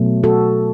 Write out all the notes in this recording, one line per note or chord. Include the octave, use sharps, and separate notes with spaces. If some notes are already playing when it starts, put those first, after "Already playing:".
Already playing: B2 F#3 A3
F#4 A4